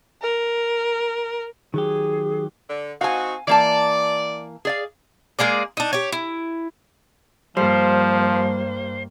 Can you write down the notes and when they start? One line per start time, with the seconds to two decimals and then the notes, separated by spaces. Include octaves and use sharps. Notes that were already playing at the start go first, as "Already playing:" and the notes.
0.22 A#4
1.74 D#3 F#3 G4 G#4
2.69 D3
3.01 C4 D#4 F#4 F5 G#5
3.47 E3 A#3 D5 A5
4.65 G#4 D5 F5
5.39 G#3 A#3 G#4 D5
5.77 D4 D#4
5.93 G4 C#5
6.12 E4
7.57 G2 F3 G3 A#3 C5